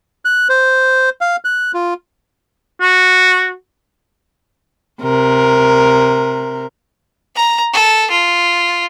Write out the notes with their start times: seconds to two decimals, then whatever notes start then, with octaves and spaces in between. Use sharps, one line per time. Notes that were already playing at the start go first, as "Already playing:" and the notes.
0.25 F#6
0.49 C5
1.21 F5
1.45 F#6
1.74 F4
2.81 F#4
5.01 C3 A#4
7.36 A#5
7.73 A4
8.11 F4